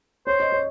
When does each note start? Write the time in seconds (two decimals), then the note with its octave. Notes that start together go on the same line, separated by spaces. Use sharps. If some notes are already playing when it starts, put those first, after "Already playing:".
0.27 C5 C#5
0.40 D#5
0.52 C#5